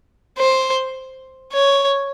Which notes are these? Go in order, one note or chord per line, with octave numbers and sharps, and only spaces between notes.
C5
C#5